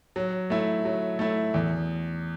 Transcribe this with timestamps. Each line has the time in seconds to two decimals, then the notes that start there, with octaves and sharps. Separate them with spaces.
0.16 F#3
0.50 A3 E4
0.85 F#3
1.19 A3 E4
1.54 E2